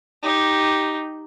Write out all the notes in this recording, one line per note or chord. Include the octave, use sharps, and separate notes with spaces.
D#4 G4